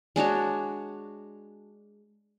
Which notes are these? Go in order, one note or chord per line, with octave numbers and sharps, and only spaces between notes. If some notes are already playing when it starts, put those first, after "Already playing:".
G#3 D4 F#4 C#5